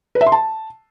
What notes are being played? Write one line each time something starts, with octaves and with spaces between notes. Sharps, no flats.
B4
E5
C6
A5